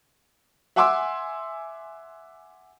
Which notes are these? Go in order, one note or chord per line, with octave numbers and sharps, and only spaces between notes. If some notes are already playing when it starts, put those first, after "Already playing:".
E5 F#5 G#5 C6 D6 E6